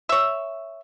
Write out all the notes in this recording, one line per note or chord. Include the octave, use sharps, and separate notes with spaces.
C#5 E5